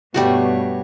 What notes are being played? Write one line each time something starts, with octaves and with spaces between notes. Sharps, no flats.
G2 B2 G3 A3 F#4 C#5